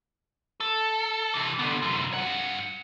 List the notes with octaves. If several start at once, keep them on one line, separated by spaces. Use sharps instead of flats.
A4
C3 E3
D3 B3
C2 F#2
G2 F#5